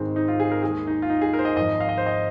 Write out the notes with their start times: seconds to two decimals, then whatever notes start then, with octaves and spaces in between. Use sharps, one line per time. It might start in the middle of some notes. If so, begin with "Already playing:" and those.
Already playing: G#1 G#2 D#3 G#3 C4
0.16 D#4
0.28 F4
0.40 G#4
0.52 A#4
0.63 D#2 D#3 G#3 G#4
0.87 D#4
1.02 F4
1.10 D#4
1.22 G#4
1.33 A#4
1.39 C5
1.45 D#5
1.56 G#1 G#2 F3 D#5
1.81 F5
1.89 D#5
1.98 C5
2.06 D#5